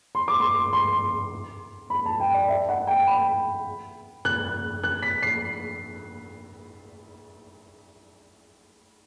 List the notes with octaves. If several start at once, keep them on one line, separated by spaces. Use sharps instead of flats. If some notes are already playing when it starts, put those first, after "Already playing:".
C6
D6
C6
C6
B5
A5
G5
D5
E5
F#5
G5
B5
F#6
F#6
B6
C7